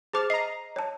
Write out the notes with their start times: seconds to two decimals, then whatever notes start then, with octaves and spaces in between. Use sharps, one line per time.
0.14 G#4 C5 A5 D6 F6
0.30 D#5 A#5 C7
0.76 C#5 A5